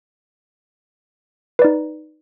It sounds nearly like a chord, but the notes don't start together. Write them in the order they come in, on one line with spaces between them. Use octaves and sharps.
B4 D5 D#4